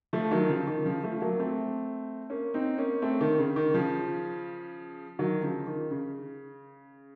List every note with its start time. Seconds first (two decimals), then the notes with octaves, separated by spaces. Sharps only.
0.13 F3 A3
0.31 D#3 F#3
0.49 C#3 F3
0.67 D#3
0.85 C#3 F3
1.03 F3 A3
1.21 F#3 A#3
1.40 A3 C4
2.30 A#3 C#4
2.54 C4 D#4
2.78 A#3 C#4
3.02 A3 C4
3.21 D#3
3.38 C#3
3.56 D#3
3.74 C#3 F3
5.19 D#3 F#3
5.43 C#3 F3
5.67 D#3
5.91 C#3